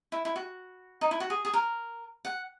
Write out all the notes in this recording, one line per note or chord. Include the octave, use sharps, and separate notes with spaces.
E4
E4
F#4
D#4
E4
F#4
G#4
G#4
A#4
F#5